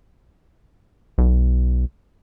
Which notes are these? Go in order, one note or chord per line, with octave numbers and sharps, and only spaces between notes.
B1